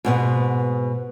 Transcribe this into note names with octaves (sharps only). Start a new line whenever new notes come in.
G#2 B2 B3